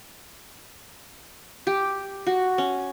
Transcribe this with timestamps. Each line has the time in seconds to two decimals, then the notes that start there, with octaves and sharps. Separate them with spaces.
1.67 G4
2.27 F#4
2.58 C#4